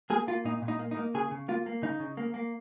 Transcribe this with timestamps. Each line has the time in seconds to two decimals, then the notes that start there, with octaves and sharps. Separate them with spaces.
0.10 A#3 G#4
0.27 A#3 F4
0.45 A#2 D#4
0.62 A#2
0.68 D#4
0.79 A#3
0.91 D#4
0.97 A#3
1.14 C#3 G#4
1.31 C#3
1.48 A#3 F4
1.66 A#3
1.82 C#3 D#4
2.00 C#3
2.17 A#3
2.34 A#3